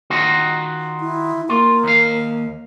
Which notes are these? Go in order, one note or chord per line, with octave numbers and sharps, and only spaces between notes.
D#3 F4 F#4
E4
A#3 F4
D#2 F5